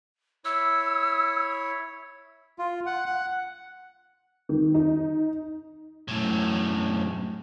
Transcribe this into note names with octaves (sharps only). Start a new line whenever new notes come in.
E4 C#5 E6
F4
F#5
F#5
D#3
D#4
F#2 A2